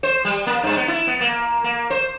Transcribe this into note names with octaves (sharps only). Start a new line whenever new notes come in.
C5
G3
A#3
G2
B3
E4
B3
A#3
A#3
C5